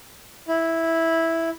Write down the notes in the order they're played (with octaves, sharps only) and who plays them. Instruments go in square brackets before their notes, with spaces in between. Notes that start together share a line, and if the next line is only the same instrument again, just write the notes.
[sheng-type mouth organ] E4